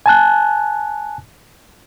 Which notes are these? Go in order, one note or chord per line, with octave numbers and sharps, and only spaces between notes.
G#5 A5 F#6